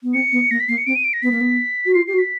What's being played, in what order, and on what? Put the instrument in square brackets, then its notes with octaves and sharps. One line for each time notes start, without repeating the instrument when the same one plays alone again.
[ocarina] B3
[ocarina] C4 [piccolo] C#7
[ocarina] B3
[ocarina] A#3 [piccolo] A#6
[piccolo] B6
[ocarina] A#3 [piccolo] C7
[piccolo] C#7
[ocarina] C4 [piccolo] D7
[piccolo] D#7
D7
A#6
[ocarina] B3 [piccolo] B6
[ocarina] A#3
B3
F#4
[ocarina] F4 [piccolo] C7
[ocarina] G4 [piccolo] C7
[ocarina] F#4
[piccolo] B6